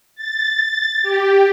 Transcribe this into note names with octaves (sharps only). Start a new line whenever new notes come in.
A6
G4